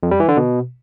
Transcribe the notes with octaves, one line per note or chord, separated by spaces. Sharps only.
F2
G3
E3
D3
B2